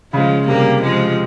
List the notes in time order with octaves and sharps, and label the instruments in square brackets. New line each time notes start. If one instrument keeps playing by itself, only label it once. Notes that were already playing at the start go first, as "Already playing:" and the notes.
[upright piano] C#3 [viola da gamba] F3 G#3
[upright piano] C3 [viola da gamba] G3 A#3
[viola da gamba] F3 G#3